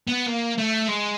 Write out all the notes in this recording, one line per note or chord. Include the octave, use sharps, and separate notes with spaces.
B3
A#3
A3
G#3